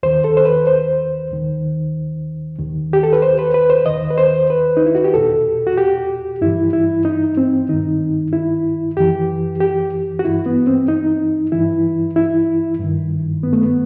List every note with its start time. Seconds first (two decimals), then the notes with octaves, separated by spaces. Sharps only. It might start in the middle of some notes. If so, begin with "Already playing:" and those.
0.03 D#2 D#3 C5
0.24 A4
0.37 C5
0.45 B4
0.67 C5
1.31 D#2 D#3
2.58 D#2 D#3
2.93 G4
3.03 A4
3.13 B4
3.22 C5
3.39 B4
3.54 B4
3.70 C5
3.86 D#2 D#3 D#5
4.10 B4
4.18 C5
4.50 B4
4.77 D#4
4.86 E4
4.95 F#4
5.04 G4
5.14 E2 B2 A4
5.67 F#4
5.77 G4
6.41 G2 E3 E4
6.73 E4
7.05 D#4
7.37 C4
7.69 G2 D#3 D#4
8.33 E4
8.97 F#2 E3 G4
9.61 G4
10.19 F#4
10.24 G2 E3 E4
10.46 B3
10.67 C4
10.88 D#4
11.52 G2 E3 E4
12.16 E4
12.80 G2 D#3
13.43 B3
13.53 A3
13.62 B3